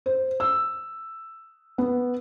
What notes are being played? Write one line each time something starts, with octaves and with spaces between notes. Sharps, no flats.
C5
E6
B3